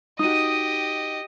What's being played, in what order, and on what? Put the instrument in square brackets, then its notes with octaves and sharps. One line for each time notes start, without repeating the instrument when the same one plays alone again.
[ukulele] D#4 F#4 [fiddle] G4 D#5 [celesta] D#6 D#7